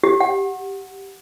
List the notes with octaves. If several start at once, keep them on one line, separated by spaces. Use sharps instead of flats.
G4
F#5